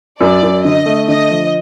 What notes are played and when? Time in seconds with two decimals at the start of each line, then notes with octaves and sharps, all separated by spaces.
0.20 F#2 D5
0.43 F#2
0.64 D3 D#5
0.86 A3
1.08 D3 D#5
1.31 F3